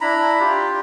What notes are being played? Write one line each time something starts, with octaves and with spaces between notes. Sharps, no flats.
D4 E4 A#5 B5
F4 G4